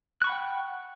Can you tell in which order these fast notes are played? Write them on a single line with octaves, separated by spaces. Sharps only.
F#6 C#6 B5 F#5 G5